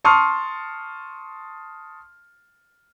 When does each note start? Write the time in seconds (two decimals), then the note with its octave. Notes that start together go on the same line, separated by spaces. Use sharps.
0.05 A5 C6 C#6 D#6 F6